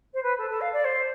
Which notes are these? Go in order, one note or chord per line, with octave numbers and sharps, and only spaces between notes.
C5
B4
A4
A4
F5
D5
C5